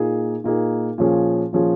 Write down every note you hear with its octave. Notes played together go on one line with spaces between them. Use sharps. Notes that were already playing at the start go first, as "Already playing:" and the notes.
Already playing: A#2 A#3 D#4 G#4
A#2 A#3 D#4 G#4
A#2 F3 C#4 G#4
A#2 F3 C#4 G#4